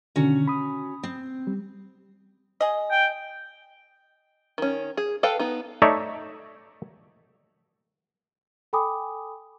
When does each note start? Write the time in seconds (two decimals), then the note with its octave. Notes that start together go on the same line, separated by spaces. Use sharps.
0.16 B2 D3 D#3 C#4 F#4 A#5
0.48 B5 D#6
1.03 C4
1.47 G3
2.61 G#4 D#5
2.91 G5
4.58 D#3 C#4
4.97 G#4
5.23 A4 B4 F5 G5
5.39 B3 D#4
5.82 A3 D#4 C#5 D5 E5
8.73 A4 G5 G#5 B5 D6 D#6